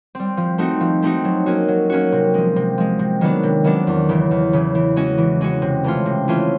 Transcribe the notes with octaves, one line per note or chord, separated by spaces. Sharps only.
G3 C4
F3
A3 C4 D#4 F#4
F3
A3 C4 D#4 F#4
F#3
A#3 C#4 F#4
F#3
A#3 C#4 F#4
C3
F3 G#3
C3
F3 G#3
C3
D#3 F#3 B3 D4
C3
D#3 F#3 B3 D4
E2
C#3 E3
E2
C#3 E3
E3
G#3 C#4 F#4
E3
G#3 C#4 F#4
C3
E3 A3 C#4 F4
C3
E3 A3 C#4 F4